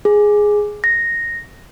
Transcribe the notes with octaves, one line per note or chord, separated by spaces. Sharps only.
G#4
A#6